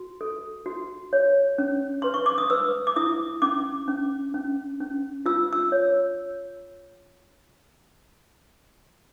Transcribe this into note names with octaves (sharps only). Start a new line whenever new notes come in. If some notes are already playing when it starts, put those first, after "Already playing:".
Already playing: F#4
A4
F#4
C#5
C#4
B4 C6
C#6
D6
D#6
B4 E6
D6
E4 D#6
C#4 D6
C#4
C#4
C#4
F4 E6
E6
C#5